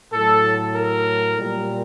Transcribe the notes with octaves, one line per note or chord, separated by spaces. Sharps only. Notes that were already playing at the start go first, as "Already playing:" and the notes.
A2 F#3 A4
A#4
A#2 G3